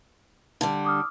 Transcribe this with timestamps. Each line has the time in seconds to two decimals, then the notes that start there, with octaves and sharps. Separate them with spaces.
0.61 D3 G3
0.85 D6 D#6 F6